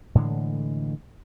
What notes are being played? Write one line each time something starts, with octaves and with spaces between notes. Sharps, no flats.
A2 D3 E3 G#3